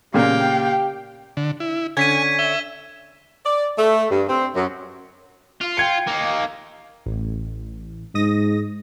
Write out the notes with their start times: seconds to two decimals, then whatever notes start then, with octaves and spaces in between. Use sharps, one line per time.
0.14 A#2 C#3 A#3 G4 F5 G5
1.37 D3
1.60 E4
1.97 D3 C#4 G#5 G#6 B6 D#7
2.39 E5 G7
3.45 D5
3.78 A3
4.11 G2
4.29 C4
4.55 F#2
5.61 F4
5.77 G5 G#6 C#7
6.07 A#3 D#4
7.06 A1
8.15 G#2 D#5 D#6 A#6